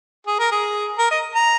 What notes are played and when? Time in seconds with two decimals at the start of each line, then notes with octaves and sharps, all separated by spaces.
0.27 G#4
0.39 A#4
0.51 G#4
0.98 A#4
1.11 D#5
1.35 A#5